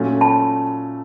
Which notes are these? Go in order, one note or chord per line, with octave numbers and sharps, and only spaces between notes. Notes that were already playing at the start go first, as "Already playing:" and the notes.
Already playing: A#2 F#3 A3 C#4
A5 B5